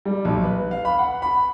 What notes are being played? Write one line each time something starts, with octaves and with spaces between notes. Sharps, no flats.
G3
B1
B4
F5
B5
F#5
B5